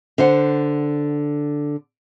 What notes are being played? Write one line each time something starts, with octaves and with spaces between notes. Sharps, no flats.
D3 C5 F#5